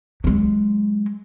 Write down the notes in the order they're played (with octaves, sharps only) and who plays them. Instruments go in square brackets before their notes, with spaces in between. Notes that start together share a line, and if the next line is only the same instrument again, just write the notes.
[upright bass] F#3 G#3